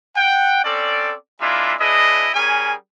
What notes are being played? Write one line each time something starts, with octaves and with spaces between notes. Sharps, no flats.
F#5 G5
C4 C#4 A4 D5
G#3 A#3 D4 E4 F4 E5
D4 E4 G#4 B4 D#5
G3 C#4 G#4 A#4 G#5